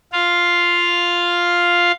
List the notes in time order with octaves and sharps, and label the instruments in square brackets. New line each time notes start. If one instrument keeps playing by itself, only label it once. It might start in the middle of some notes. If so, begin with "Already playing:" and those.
[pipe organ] F4 F5